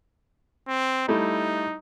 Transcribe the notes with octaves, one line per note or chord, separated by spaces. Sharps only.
C4
G3 A3 D#4 E4